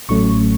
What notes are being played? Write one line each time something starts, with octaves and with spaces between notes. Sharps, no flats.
A1 A2 F#3 A3 C#4 C#6